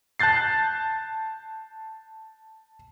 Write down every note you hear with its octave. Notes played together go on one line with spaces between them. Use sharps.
A5 F#6 G6 A6 C7